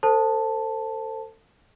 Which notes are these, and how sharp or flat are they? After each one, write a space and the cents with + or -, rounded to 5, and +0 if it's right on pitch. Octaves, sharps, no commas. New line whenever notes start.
A4 +30 C5 +0 A5 +0